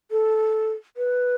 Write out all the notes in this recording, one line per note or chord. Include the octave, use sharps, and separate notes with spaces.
A4
B4